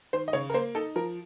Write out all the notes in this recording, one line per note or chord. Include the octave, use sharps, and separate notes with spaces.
D#3 C5
D#5
C#3 C#5
A#4
A#3 C5
D#4 A4
F3 A#4